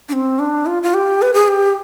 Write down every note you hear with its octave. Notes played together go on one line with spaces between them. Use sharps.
D4
C4
D4
F4
F4
G4
B4
G#4
G4